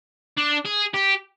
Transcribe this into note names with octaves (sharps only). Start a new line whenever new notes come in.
D4
G#4
G4